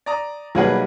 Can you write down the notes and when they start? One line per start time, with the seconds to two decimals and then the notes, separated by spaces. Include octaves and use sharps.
0.06 D5 A#5 D#6
0.55 B1 G3 A#3 G#4 B4 F#5